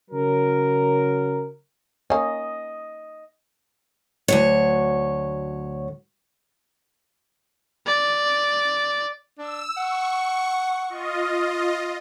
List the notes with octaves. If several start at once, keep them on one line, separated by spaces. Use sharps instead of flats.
C#3 F#3 A#4
A#3 C#4 D#5
D2 F#3 C#5
D5
D4 E6
F#5 C#6
F4 D#5